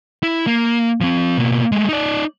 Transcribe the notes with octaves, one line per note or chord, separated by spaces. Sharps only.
E4
A#3
F3 C4
B2 A#3
G#3 A3
D#4 D5